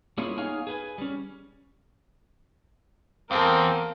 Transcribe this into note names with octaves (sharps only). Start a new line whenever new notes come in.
G3 A#3 C#4 E4 F4 G#4
B3 D#4 G#4 C#5 F5 G#5
G#4 B4 G#5
G3 C#4
E2 A#3 C4 A4 A#4